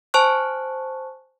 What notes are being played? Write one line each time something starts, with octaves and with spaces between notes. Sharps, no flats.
C5 G#5 A5 C#6 F#6